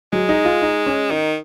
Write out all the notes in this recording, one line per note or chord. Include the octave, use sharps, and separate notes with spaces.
F#3 G#3
D#4
F4
D#4
C#4
D#3 D#4